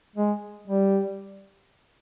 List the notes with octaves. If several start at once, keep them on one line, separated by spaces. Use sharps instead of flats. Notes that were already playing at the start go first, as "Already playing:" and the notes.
G#3
G3